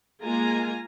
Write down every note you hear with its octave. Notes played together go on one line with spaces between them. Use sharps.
G#3 A#3 F4 G#5 A#5